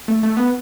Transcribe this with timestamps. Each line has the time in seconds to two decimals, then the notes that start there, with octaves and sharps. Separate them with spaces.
0.08 A3
0.23 A3
0.37 B3